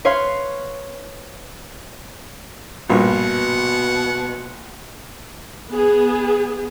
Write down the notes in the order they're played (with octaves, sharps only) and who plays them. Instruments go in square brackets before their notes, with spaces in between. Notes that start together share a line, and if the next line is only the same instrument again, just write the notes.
[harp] B4 C#5 F5 C6
[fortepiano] A#1 G2 [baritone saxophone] B2 [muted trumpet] F#5
[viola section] B3 G#4